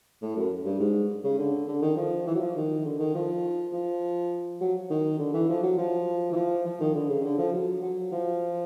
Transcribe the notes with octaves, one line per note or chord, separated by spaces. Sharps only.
A2
F#2
G2
G#2
C#3
D3
D3
D#3
F3
E3
F#3
F3
D#3
D3
D#3
F3
F3
F#3
D#3
D3
E3
F3
F#3
F3
E3
F3
F3
D#3
D3
C#3
D3
F3
F#3
F#3
F3